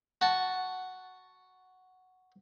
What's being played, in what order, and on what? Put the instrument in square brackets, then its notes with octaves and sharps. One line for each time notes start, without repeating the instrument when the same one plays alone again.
[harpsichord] F#4 A5